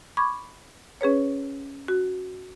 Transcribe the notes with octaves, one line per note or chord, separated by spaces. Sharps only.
B5 C#6 D6 G#6
C#4 G#4 B4 C#5
F#4